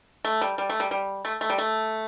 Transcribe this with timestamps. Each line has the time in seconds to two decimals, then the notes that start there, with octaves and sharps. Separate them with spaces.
0.25 A3
0.41 G3
0.58 G3
0.70 A3
0.80 G3
0.91 G3
1.25 A3
1.41 A3
1.50 G3
1.58 A3